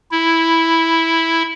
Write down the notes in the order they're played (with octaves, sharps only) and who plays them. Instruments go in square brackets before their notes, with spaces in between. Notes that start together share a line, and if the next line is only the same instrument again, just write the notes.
[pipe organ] E4